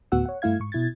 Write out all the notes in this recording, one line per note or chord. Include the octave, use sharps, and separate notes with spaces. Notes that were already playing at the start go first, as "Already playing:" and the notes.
D2 A2 B3 F#4 F#5 E6
C#5 F#5
G2 A3 E4 F5 G#6
G#2 C#6
B2 E4 G#6 A6